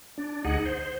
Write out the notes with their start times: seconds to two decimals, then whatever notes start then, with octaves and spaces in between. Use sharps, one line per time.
0.18 D4
0.45 D2 D#4 G#4 F#5
0.66 C5